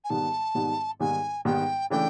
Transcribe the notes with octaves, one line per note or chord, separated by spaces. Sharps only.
G#5
G#2 D#3 G3 B3 A5
G#2 D#3 G3 B3
G#2 D#3 G3 B3 G#5
G#2 D#3 G3 B3 G5
C#3 E3 A3 D4 G5